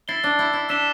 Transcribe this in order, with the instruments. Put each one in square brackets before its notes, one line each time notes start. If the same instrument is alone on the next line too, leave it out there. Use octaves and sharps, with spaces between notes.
[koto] E4 [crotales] A6 C7 G7
[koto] D4
E4
E4
[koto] D4 [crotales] E6 B6 E7 G7